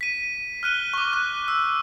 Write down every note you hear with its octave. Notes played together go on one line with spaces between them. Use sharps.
B6 D#7
F6 F#6 D#7 G7
C#6 D6
F#6
E6